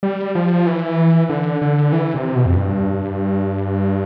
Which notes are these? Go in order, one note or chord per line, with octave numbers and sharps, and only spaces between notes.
G3
F3
E3
D3
D3
E3
C3
B2
F2
G2